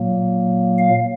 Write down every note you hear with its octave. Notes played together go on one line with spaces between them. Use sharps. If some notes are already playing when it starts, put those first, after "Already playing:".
Already playing: A#2 F#3 A#3
F5